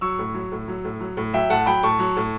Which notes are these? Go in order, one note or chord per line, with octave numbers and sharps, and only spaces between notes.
F#3 C#6 E6
A2
F#3
A2
F#3
A2
F#3
A2
F#3 E5 G5
A2 F#5 A5
F#3 G5 B5
A2 A5 C#6
F#3
A2